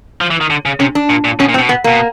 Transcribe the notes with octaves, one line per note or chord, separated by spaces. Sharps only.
F3
E3
D#3
D3
C#3
C3 C#4
D4
A#2
A#2
B2 C#4
A#2
C4
B2
B3
B2 A#3